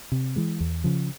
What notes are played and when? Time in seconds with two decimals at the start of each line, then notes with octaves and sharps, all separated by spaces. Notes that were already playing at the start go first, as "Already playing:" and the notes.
0.12 C3
0.36 E3 G#3
0.60 E2
0.84 C#3 F3